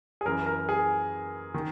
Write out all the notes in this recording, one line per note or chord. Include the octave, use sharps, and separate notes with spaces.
G#4
F#2 E3 A#4
A#4
G#4
D#3